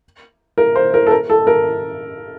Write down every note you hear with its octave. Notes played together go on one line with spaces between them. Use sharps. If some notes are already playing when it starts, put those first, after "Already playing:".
A#4
C5
A#4
A4
A#4
A4
A#4